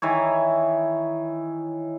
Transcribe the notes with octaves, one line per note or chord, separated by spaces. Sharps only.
D#3 E3 E4 C#5